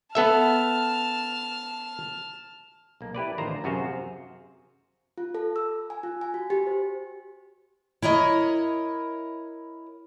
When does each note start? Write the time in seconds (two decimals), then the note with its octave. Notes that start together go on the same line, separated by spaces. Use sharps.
0.15 B3 A4 E5 A5 F6
3.01 B1 A#3
3.15 E4 G4 B4 D5
3.38 A1 D3 D#3 F4 C5 A#5
3.64 F#2 C3 F#4 G#4 C5 F5
5.18 F4
5.35 A4
5.56 E6
5.90 G#5
6.03 F4
6.21 G#5
6.34 F#4
6.50 G4
6.67 C5
8.02 E4 A#4 C#5 D#5